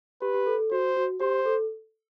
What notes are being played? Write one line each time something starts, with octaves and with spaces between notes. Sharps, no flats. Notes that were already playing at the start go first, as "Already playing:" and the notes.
G4 B4
G4
A4
A4
F#4 C5
F#4
G4 C5
A4